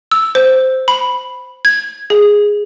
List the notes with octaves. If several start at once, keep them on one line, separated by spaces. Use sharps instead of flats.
E6
C5
B5
G#6
G#4